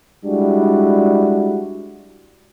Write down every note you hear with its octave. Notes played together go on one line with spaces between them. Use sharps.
G3 G#3 D4 E4 F#4